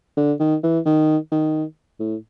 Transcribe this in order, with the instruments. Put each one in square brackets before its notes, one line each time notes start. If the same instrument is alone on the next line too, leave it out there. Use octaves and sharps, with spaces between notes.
[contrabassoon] D3
D#3
E3
D#3
D#3
A2